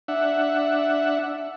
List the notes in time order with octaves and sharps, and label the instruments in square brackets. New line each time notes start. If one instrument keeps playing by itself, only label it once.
[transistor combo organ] D4 E5 F#5